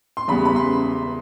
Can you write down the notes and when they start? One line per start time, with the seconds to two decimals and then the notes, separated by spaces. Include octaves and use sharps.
0.17 C6
0.28 E2 C#3 E3 G3 B3 B5
0.45 B5
0.56 C6